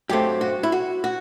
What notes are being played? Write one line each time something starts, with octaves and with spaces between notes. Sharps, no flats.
G2 F#3 A3 C4 G4
F#4
E4
F#4
F#4